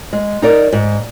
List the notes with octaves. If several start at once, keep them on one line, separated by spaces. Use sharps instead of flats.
G#3
D#4 A#4 D5
G#2